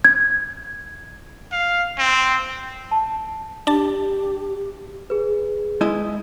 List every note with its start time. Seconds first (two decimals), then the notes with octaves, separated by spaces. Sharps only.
0.04 G#6
1.52 F5
1.98 C4
2.91 A5
3.67 D4 G4 A5
5.10 G#4 B4
5.81 G#3 E4 D#5